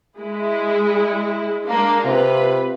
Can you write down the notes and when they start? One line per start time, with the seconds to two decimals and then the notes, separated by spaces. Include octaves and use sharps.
0.18 G#3 E4
1.66 G#3 A#3 D4
2.05 C3 F4 B4